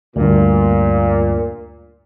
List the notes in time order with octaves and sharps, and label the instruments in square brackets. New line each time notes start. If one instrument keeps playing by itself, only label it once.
[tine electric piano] D2 G2 [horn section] A#2